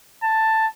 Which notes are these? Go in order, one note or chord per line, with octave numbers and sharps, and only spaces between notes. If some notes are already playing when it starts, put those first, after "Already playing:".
A5